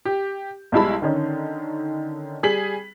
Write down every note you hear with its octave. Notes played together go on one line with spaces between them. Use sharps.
G4
B1 G3 G#3 E4 A5 B5
D3 D#3 C#4 D#4
G3 G#4 B6 F#7